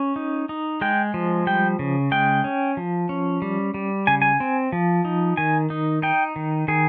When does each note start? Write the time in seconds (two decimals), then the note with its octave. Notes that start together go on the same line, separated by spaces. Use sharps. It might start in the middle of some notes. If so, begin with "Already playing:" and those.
Already playing: C#4
0.16 D#4
0.49 D#4
0.81 G#3 G5
1.14 F3
1.47 G3 G5
1.79 C#3
2.12 G#3 G5
2.44 C#4
2.77 F3
3.09 C#4
3.42 G3
3.74 G3
4.07 C#3 G#5
4.22 G#5
4.40 C4
4.72 F3
5.05 D#4
5.37 D#3 G#5
5.70 D#4
6.02 D#4 G5
6.36 D#3
6.68 D#3 G#4